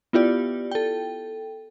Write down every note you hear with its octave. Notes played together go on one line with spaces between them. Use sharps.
B3 E4 F4 G4 D5
A4 G5